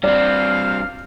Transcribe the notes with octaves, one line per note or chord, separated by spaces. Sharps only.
G2 C4 D5 F5